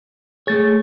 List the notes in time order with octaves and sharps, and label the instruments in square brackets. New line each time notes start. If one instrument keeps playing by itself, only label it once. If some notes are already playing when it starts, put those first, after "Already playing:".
[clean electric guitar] A3 C#5 [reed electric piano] G#4 A6